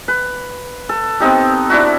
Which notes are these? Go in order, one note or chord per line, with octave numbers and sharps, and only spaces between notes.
B4
A4
B3 C4 D#4 G4
D4 E4 F#4